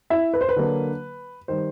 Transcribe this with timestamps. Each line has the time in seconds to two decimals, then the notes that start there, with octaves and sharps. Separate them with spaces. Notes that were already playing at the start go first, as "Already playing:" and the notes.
0.10 E4 E5
0.34 B4
0.41 C5
0.49 B4
0.56 D3 F#3 A#3
1.48 D#3 G3 C5